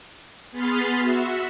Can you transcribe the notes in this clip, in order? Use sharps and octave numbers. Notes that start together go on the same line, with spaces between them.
B3 G#4 B5 C6 F6 A6
F#4 E5